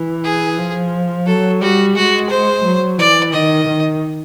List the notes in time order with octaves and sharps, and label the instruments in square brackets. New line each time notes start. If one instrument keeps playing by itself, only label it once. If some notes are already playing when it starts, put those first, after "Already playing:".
Already playing: [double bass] E3
[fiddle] G#4
[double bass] F3
[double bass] F#3 [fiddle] A4
[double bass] G3 [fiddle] F#4
[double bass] G#3 [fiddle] F#4
[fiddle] C5
[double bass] F#3
[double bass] E3 [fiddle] D5
[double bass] D#3 [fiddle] D#5
[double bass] D#3